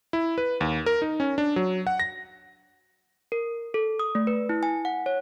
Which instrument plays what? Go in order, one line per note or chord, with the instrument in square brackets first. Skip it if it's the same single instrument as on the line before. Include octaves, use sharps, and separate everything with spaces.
[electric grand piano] E4
B4
D#2
A#4
D#4
C#4
D4
F#3
F#5
A#6
[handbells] A#4
A4
D#6
A3
B4
E4
G#5
F#5
C#5